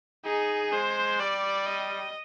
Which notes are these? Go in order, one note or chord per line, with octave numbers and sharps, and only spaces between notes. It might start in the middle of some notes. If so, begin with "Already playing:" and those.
D#4 G#4
G#3 C5
G3 D5
D#5